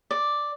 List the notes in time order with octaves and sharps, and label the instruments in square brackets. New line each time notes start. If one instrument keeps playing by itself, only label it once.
[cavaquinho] D5